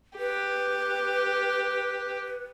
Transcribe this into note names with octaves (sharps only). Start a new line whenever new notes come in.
G4 B4